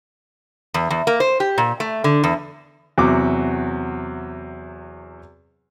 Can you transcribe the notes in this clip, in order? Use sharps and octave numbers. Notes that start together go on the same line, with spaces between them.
E2
E2
A#3
C5
G4
A#2
A3
D3
E2
E2 C3 F#3 F#4 D6